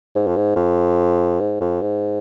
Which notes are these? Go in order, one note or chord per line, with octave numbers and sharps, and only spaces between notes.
G#2
F2
G#2
F2
G#2
F2
G#2